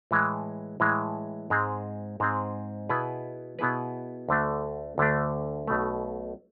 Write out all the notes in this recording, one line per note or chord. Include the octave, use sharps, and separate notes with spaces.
A2 E3 G#3
A2 E3 G#3
G#2 G#3 C4 G#4
G#2 G#3 C4 G#4
B2 B3 E4 G#4 B4
B2 B3 E4 G#4 B4
D2 D3 A3 D4
D2 D3 A3 D4
B1 B2 A3